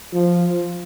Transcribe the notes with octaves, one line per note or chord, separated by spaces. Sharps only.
F3